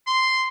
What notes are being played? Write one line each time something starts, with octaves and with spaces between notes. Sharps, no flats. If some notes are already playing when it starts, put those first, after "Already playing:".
C6